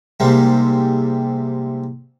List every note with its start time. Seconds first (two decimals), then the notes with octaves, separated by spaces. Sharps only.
0.20 G#2 C3 G3 A#3 C4 E4